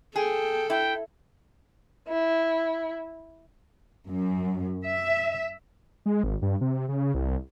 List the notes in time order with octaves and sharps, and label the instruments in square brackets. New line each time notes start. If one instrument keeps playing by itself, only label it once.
[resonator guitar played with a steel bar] G#4 [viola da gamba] A4 [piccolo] G5
[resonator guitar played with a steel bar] E4 [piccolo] G5
[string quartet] E4
[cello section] F#2
E5
[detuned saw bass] G#3
G#1
G2
C3
C#3
C2